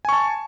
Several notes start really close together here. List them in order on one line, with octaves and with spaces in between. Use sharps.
G#5 C#6 A5